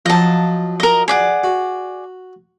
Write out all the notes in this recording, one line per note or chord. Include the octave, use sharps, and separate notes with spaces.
F3 F#3 D#5 A5
A#4 D#5
G#4 D5 F#5
F#4